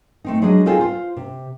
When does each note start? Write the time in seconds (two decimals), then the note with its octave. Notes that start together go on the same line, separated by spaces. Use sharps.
0.24 A3 C4 D#4
0.42 F#3 G#3 D4 G#4 C5 D#5
0.66 C4 D#4 F4 G#4 A4 C5
0.79 F4 C5
1.17 C3